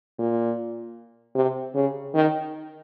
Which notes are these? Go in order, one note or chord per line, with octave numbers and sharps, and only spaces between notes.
A#2
C3
C#3
D#3